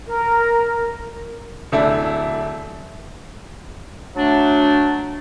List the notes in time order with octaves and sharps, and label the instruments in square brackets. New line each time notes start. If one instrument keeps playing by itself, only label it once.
[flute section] A#4
[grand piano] D1 A3 D4 E4
[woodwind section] F#3 A3 D4